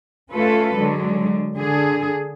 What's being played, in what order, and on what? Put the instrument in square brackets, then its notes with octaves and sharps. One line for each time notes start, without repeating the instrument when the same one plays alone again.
[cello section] A3 C#4 F4 A4 B4
D3 F#3 G#3
D3 G#4